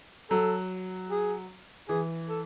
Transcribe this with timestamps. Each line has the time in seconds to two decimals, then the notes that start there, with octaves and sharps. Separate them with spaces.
0.30 F#3 A4
1.10 G#4
1.89 E3 G#4
2.29 A4